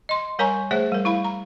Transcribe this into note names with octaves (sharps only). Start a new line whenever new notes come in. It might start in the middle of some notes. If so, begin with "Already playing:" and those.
D#5 C6
G3 A#4 C#5 G#5 A#5 C#6
A3 G#4 C5 C#5 E5
G3 A#4
E4 F5 B5
A#5